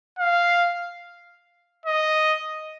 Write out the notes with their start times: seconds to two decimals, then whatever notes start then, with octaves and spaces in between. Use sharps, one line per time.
0.19 F5
1.86 D#5